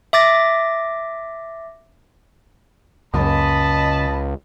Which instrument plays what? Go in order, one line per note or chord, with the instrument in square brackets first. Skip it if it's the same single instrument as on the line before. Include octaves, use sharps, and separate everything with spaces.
[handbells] E5 D6 A6 A#6
[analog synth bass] C#2 [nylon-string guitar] F#2 C#3 A#3 [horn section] D#5 A5 B5